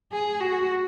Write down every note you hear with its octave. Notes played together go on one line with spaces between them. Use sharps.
G#4
F#4